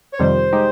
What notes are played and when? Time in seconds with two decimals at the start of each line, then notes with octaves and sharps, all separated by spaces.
0.11 C#5
0.19 F2 C3 D#3 G3 C5
0.53 G#3 D#4 G4